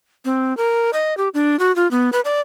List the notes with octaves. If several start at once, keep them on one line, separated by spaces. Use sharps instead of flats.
C4
A#4
D#5
G4
D4
F#4
F4
B3
B4
D5